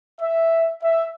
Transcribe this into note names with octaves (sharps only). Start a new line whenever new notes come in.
E5
E5